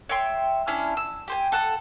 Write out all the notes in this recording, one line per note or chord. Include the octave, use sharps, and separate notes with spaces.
C#5 E5 G5 C6
C#4 D4 E4 F6
E6
G4 C5 G#5
A4 F#5 A5